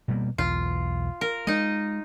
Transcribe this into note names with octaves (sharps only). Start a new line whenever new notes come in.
B2 G3 A#3
B1 E2 F4
A#4
G#3 D#4 D#5